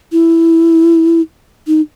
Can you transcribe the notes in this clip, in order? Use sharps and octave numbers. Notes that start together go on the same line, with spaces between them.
E4
D#4